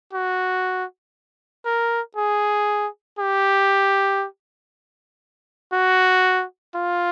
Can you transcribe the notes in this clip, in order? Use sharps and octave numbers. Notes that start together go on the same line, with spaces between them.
F#4
A#4
G#4
G4
F#4
F4